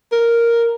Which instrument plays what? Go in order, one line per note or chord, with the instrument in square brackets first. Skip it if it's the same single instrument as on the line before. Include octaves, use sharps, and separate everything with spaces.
[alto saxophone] A#4